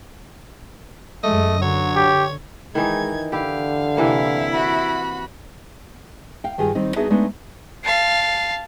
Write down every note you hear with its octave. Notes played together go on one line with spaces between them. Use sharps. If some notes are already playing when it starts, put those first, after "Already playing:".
F#2 G#3 A3 D#5
D3 F#3 C#5
G4
D#3 E3 G#3 D#4 G#6
D3 E4 G4 F5
C3 E3 A#3 E4
F#4 B5
F5 G5
G2 D#3 F4 G4 G#4
D#3 G3 C4 D#4
B3 D4 D#4 F#4 G#4 E5
G#3 A3 B3 D4 D#4
F5 A5 C7